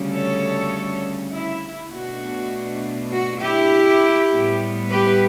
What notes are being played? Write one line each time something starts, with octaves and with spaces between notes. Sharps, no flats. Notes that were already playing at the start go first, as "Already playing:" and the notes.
Already playing: D2 C#3 G3 C#4
A4 C#5
E4
B2 A3 D4 F#4
F#4
E4 G4
A2 G3 B3
G4 B4